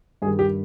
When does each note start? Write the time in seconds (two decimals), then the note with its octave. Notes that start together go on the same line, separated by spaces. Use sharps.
0.22 G2 D#3 G3 G#4
0.39 G4